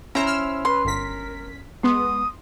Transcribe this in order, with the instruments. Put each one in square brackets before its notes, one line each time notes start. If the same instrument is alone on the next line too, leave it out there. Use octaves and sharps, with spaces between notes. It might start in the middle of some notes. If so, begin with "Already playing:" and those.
[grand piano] C#4 [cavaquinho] E4 C5 [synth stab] A#5
[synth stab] E6 F6
[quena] B4 [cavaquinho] C6
[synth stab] G1 B6 [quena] A#4
[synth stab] G#3 B3 [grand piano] C6 [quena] D#6